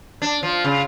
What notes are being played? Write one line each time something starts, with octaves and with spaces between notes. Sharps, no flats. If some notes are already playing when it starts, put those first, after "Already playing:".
D4
F3
C#3